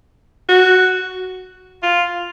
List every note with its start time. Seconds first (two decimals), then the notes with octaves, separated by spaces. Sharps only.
0.49 F#4
1.83 F4